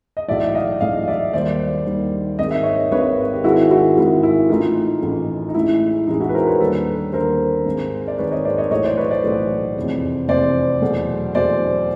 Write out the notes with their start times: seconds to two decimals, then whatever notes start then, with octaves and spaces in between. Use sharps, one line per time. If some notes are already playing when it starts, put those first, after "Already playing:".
0.17 D#5
0.28 B1 A2 E3 D5 E5
0.55 D#5 F5
0.81 B1 A2 E3 D#5 F5
1.08 D5 E5
1.33 D#2 D#3 G3 C5 D5
1.86 D#2 D#3 G3
2.39 G#1 G#2 D#3 D#5
2.51 E5
2.63 C#5 D#5
2.91 G#1 G#2 D#3 B4 C#5
3.33 G4
3.44 G#1 G#2 D#3 G#3 E4 F#4
3.71 E4 F#4
3.97 G#1 G#2 D#3 G#3 E4
4.23 E4
4.49 A1 A2 E3 A3 D#4 F4
5.02 A1 A2 E3 A3
5.49 D#4
5.54 A1 A2 E3 G#3 E4
6.07 A1 A2 E3 G#3 D#4
6.20 E4 F#4
6.29 B4
6.34 A#4 C5
6.47 B4 C#5
6.60 D#2 D3 G3 A4 B4
7.13 D#2 D3 G3 A#4 C5
7.66 G#1 G#2 D#3 G#3
8.08 D5
8.18 G#1 G#2 D#3 G#3 B4 C#5
8.32 C#5 D#5
8.45 C5 D5
8.58 C#5 D#5
8.70 B1 A2 E3 A3 C#5 D#5
8.84 C5 D5
8.97 B4 C#5
9.11 C5 D5
9.24 B1 A2 E3 A3
9.77 F1 E2 C3
10.29 F1 E2 C3 C5 D5
10.81 E2 B2 F#3 A3
11.35 E2 B2 F#3 A3 C5 D5